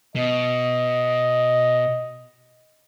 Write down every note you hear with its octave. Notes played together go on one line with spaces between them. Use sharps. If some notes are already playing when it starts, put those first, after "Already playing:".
B2 D#5